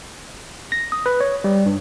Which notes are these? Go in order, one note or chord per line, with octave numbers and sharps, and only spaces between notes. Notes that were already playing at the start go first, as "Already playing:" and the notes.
A#6
D#6
B4
C#5
G3
G2